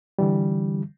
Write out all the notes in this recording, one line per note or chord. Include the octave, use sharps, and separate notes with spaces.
D3 E3 G3